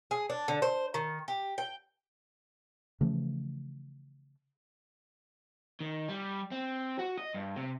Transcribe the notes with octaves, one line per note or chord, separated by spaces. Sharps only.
G#4
D4
D3
C5
D#3
G4
G5
C#3 E3 F3 A3
D#3
G3
C4
F#4
D#5
G2
C3